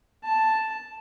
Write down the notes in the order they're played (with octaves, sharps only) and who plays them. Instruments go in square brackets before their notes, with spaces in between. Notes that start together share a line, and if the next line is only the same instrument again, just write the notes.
[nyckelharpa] A5